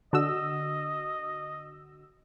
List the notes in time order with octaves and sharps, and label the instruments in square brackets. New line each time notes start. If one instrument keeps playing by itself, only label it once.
[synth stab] D3 F#4 E6 [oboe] D#5